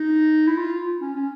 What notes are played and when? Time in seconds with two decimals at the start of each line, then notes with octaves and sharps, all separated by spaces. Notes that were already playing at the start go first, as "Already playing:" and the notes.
Already playing: D#4
0.47 E4
0.58 F4
1.02 C#4
1.16 C#4